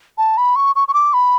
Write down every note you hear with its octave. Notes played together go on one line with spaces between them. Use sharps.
A5
B5
C#6
C#6
C#6
D6
B5